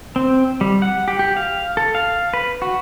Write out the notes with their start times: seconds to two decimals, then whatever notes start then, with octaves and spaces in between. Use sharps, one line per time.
0.16 C4
0.61 G3
0.82 F#5
1.08 G4
1.19 G4
1.37 F5
1.77 A4
1.95 F5
2.34 B4
2.62 F#4